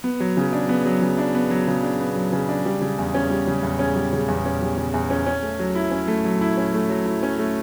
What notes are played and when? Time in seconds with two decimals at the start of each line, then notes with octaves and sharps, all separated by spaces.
0.04 B3
0.20 F#3
0.37 C#3
0.53 D4
0.69 B3
0.85 F#3
1.02 C#3
1.18 D4
1.35 B3
1.51 F#3
1.68 C#3
1.83 D4
2.00 B3
2.16 F#3
2.32 C#3
2.49 D4
2.65 G3
2.81 C#3
2.98 E2
3.14 C#4
3.30 G3
3.47 C#3
3.63 E2
3.79 C#4
3.96 G3
4.13 C#3
4.28 E2
4.45 C#4
4.62 G3
4.77 C#3
4.94 E2
5.10 C#4
5.26 C#4
5.43 A3
5.59 F#3
5.75 E4
5.91 C#4
6.08 A3
6.25 F#3
6.41 E4
6.57 C#4
6.74 A3
6.90 F#3
7.06 E4
7.23 C#4
7.39 A3